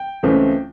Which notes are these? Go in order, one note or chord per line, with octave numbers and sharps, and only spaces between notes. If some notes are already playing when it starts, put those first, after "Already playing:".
Already playing: G5
C#2 C#3 E3 A3 C4